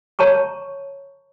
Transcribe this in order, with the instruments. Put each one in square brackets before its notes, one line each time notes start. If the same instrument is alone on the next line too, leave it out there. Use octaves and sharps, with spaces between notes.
[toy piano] C#5 A5 A#5 C#6